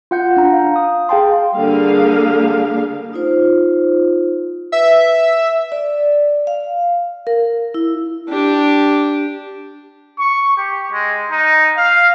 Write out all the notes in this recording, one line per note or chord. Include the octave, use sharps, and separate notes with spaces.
F4 F#5 G6
D4 A#5
F5
D#6
G#4 F5 G5 A5 C6
D3 G3 A#3 G#4 F5
D#4 F4 C5
B4 E5
D5
F5
A#4
E4
D4 G4
C#6
G4
G#3
D#4
F5